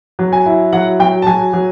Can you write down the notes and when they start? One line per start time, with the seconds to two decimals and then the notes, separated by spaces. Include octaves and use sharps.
0.19 F#3
0.33 G#5
0.46 E4
0.73 F#3 F#5
0.99 F#3 G5
1.22 A5
1.27 F#3 G#5
1.53 F#3